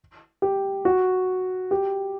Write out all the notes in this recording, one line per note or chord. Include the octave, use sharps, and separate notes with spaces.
G4
F#4
G4